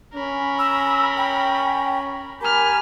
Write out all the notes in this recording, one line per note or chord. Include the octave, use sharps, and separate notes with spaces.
C#4 A#4 B5
E6
G5
G4 A#4 G#5 A#5 B5 F6